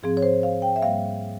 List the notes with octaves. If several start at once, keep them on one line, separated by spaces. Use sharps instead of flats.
G#2 F3 C4 G#4
C#5
C5
F5
G5
E5
G#2 G3 A#3 F5